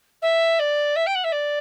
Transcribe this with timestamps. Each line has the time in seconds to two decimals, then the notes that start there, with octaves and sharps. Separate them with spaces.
0.22 E5
0.59 D5
0.95 E5
1.06 G5
1.15 F#5
1.24 E5
1.32 D5